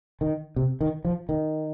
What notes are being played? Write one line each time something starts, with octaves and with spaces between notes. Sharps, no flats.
D#3
C3
D#3
F3
D#3